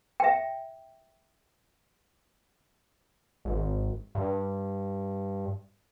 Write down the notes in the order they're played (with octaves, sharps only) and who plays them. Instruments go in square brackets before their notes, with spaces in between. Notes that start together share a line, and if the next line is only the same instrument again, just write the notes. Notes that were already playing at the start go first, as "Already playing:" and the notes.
[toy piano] E5 G5
[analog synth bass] G#1
G2